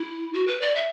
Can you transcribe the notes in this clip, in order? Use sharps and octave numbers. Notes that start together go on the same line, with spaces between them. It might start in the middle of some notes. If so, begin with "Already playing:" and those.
Already playing: E4
F#4
B4
D5
E5